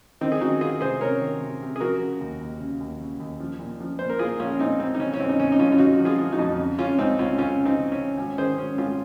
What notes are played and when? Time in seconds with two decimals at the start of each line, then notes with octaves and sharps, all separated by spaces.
0.21 D#3 C4 D#4
0.32 G#4
0.41 D#3 D#4 F#4
0.61 D#3 F4 G#4
0.81 C3 G#4 C5
1.01 C3 A#4 C#5
1.21 D#3
1.41 C3
1.61 C3
1.76 G#4
1.80 F3 F#4 A#4
2.00 C#3
2.20 D#2
2.41 D#2
2.60 C#3
2.80 D#2
3.01 C#3
3.20 D#2
3.40 F3
3.60 A#2
3.80 F3
3.99 A#2 C5
4.10 A#4
4.19 A#2 F4 G#4
4.40 A#1 C#4 F4
4.59 A#2 C4 D#4
4.80 A#1 C4
4.95 D#4
4.99 C#3 C#4
5.14 C#4
5.20 F2 C4
5.29 D#4
5.39 C#3 C#4
5.52 D#4
5.59 F2 C#4 F4
5.72 F4
5.79 C#3 D#4 F#4
5.99 F3
6.05 F4 G#4
6.19 F3
6.32 D#4 F#4
6.39 F2
6.59 C#3
6.79 C#3 C#4 F4
6.99 C#2 C4 D#4
7.19 C#2 C#4 F4
7.38 C#2 C#4 F4
7.59 C#3
7.65 C4 D#4
7.79 C#3
7.92 C#4
7.98 C#3
8.18 G#1 C#4
8.38 D#3 G#4 C5
8.58 G#1 C#4
8.78 G#1 C#4 F4